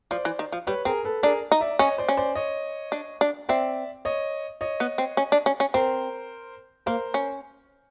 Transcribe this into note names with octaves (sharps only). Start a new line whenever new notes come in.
F3 C5 D5
E3
D#3
F3
G3 B4 C#5
C4 G#4 A#4
A4 B4
D4 G#4 A#4
D#4
D5 E5
C#4 C#5 D#5
C5 D5
C#4
C5 D5
C#5 D#5
D4
D4
C4 D5 E5
C#5 D#5
C#5 D#5
B3
C4
C#4
D4
C#4
C#4
C4 A#4 C5
A#3 A#4 C5
C#4